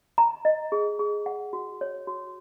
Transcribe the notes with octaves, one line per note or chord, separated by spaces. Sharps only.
A#5
D#5
G#4
G#4
F#5
F#4
C#5
F#4